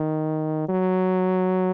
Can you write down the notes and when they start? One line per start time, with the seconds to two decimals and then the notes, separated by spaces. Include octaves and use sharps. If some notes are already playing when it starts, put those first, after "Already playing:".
Already playing: D#3
0.69 F#3